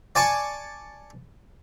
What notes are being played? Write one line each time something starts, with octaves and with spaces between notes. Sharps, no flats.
D5 G#5 A5 C#6